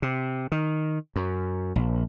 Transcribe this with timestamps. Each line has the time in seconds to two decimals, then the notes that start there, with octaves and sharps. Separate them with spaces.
0.02 C3
0.52 D#3
1.16 F#2
1.76 A#1